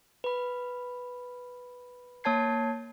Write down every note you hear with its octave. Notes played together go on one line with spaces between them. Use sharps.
B4 B5
A#3 C#5 A5 G#6 C7